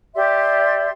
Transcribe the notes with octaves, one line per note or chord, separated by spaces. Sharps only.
G4 D5 E5 C6